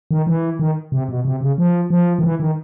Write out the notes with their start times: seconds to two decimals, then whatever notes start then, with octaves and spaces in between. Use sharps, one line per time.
0.11 D#3
0.27 E3
0.60 D#3
0.92 C3
1.09 B2
1.25 C3
1.41 C#3
1.58 F3
1.90 F3
2.19 D#3
2.24 E3
2.40 D#3